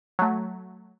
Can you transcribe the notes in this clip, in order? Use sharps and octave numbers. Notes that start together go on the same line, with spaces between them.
F#3 A3